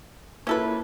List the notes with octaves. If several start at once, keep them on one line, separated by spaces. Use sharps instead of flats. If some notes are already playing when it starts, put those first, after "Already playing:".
A#3 C#4 E4 F4 A4 B4